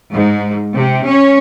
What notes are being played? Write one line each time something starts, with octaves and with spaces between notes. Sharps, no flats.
G#2
C3
C#4